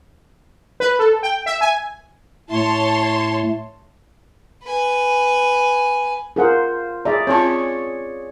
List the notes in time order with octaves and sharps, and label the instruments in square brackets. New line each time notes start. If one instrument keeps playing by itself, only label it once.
[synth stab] B4
A4
G5
E5
G#5
[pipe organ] A2 A3 [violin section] C#5 A5 C6
[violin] B4 G#5
[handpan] F4 C5 [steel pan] G#4 A#4 F#5
[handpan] G#4 D5 [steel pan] E5 A#5
[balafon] C4 F4 A5 [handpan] C#5